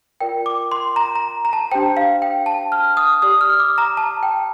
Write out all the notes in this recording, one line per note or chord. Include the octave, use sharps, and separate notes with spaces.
F4 A#4 D5 G5
D6
C6
A#5
A#5
A#5
A5
D4 G4 C5 G5
F5
G5
A5
F6
D#6
G4 D5 D#6
F6
D6
A#5
A5
G5